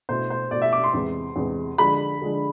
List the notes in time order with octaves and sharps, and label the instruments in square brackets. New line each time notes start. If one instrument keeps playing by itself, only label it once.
[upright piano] B2 A3 E4 [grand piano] C5
[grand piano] C5
[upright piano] B2 A3 E4 [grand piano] D5
[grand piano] E5
D6
C6
[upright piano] E2 C3 G#3
E2 C3 G#3
[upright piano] D3 F3 G#3 D4 [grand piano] B5
[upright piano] D3 F3 G#3 D4